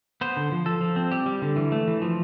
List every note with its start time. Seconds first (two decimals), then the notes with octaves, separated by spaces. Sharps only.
0.21 B3 C5
0.37 D3
0.52 F3
0.66 F3 A4
0.81 F3
0.96 C4
1.11 G3 G4
1.26 G3
1.42 D3
1.56 E3
1.72 A3
1.87 E3
2.02 F3